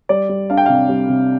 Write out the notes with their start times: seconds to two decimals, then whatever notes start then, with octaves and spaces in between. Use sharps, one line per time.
0.09 G3 D5
0.29 G3
0.50 D4 F5
0.57 G5
0.66 C3 F5
0.89 G3
1.09 C3